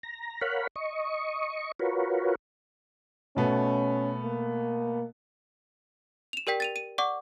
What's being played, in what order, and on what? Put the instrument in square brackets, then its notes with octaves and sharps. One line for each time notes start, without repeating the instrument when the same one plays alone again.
[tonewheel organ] A#5
A#4 C#5 F5 F#5 B5
D#5 C#6
F4 F#4 A#4 B4 C#5
[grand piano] B2 A3 B3 [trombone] C#4
[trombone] A#3
[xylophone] E7 F7
G4 A#4 D5 G5 B6
A6 D#7 F7
D#7
D5 F#5 C#6 D6